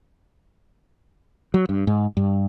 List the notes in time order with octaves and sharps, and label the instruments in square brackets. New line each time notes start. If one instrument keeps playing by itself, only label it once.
[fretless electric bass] F#3
G2
G#2
G2